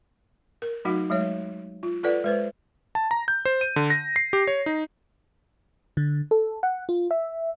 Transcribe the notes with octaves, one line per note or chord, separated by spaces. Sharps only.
A#4
F#3 A3 D#4 F#4 F#5
F#3 G#3 A3 C#5
F4
F4 A4 B4 D5 F#5
G#3 B4 C5
A5
A#5
G6
C5
D#7
D3
A#6
C7
G4
C#5
D#4
D3
A4
F#5
F4
E5